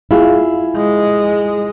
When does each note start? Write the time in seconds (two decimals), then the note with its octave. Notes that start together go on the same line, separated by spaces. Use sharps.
0.11 E4 F4 G#4
0.76 G#3